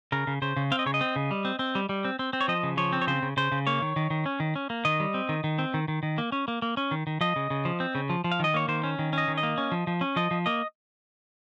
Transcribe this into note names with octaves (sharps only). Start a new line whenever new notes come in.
C#3 A#4
C#3
C#3 C5
C#3
C4 F5
D#5
C#3 C#5
D#5
C4
C#3
G3
C4
C4
G3
G3
C4
C4
C4
C#5
F3 D#5
C#3
F3 C#5
C4
C#5
C#3 C5
C#3
C#3 C5
C#3
A#3 C#5
D#3
D#3
D#3
C#4
D#3
C#4
A#3
D#3 D#5
G3
C4
D#3
D#3
C4
D#3
D#3
D#3
A#3
C#4
A#3
A#3
C#4
D#3
D#3
F3 D#5
C#3
C#3
F3
C4
C#3
F3
F3
F5
D#3 D#5
A#3 C#5
D#3 C5
C#4
D#3
C#4 D#5
D#3
D#5
A#3
C#4
F3
F3
C#4
F3 D#5
F3
A#3 D#5